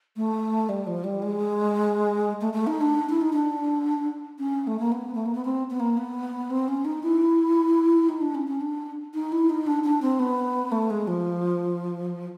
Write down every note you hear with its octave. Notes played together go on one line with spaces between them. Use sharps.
A3
G3
F3
G3
G#3
A3
A3
D#4
D4
E4
D#4
D4
C#4
A3
A#3
B3
A3
A#3
B3
C4
B3
A#3
B3
C4
C#4
D#4
E4
D#4
D4
C#4
C#4
D4
D#4
E4
D#4
D4
D4
C4
B3
A3
G#3
F3